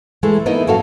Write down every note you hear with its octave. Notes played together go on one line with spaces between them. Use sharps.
E3 G#3 A3
A#3 B3 D#4 E4 D#5 E5
F#2 A2 F#4 A4 F5